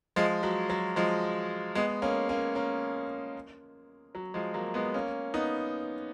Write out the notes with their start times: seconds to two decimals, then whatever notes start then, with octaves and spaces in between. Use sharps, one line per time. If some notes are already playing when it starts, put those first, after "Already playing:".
0.16 F3 G#3
0.43 F#3
0.70 F#3
0.96 F3 G#3
1.75 G#3 B3
2.02 A#3 C#4
2.29 A#3 C#4
2.55 A#3 C#4
4.15 F#3
4.34 F3 G#3
4.54 F#3 A#3
4.74 G#3 B3
4.94 A#3 C#4
5.34 B3 D#4